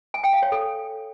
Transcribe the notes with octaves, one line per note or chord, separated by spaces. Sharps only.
G#5
G5
F5
C#5
A4